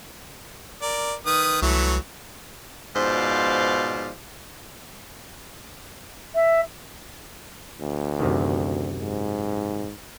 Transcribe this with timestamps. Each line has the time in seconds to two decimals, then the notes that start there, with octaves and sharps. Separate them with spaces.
0.82 A#4 D5
1.26 D#3 B4 D#6
1.62 C2 E3 F#3 A3
2.95 G#2 B2 F3 C5 D5 F5
6.35 E5
7.81 D2
8.20 F#2 C3 D#3
9.02 G#2